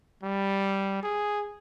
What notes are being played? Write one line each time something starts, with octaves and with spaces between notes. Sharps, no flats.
G3
G#4